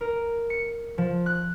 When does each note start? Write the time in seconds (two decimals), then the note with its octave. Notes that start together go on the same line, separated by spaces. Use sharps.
0.01 A#4
0.50 C#7
0.98 F3
1.26 F#6